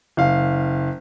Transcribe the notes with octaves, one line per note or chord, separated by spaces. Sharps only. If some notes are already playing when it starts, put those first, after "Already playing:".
F#1 F5